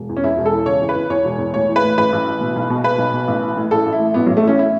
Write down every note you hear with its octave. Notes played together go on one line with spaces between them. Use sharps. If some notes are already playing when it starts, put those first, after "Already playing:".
Already playing: E1
E2
C#4
E2 E4
E1
A4
E3
C#3 C#5
E2
B4
E2
E2 C#5
E1
E2
A2 C#5
E3
B4
A2
A1 B4
A1
A1
B2
B1
B2
B2 B4
B1
B2
A1
E3
A2
A1 A4
A1
E4
A2
A1 B3
A1 F#3
A3
A2 C#4
E4